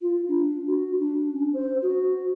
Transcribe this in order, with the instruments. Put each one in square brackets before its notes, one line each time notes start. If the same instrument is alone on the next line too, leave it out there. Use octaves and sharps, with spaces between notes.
[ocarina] F4
D4
F#4
D4
C#4
C5
F#4